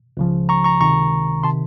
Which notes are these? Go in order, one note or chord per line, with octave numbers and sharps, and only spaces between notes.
C#2 C#3 F3
A#5 C#6
A#5 C#6
C#2 C3 D#3 A#5 C#6
C3 D#3 A5 C6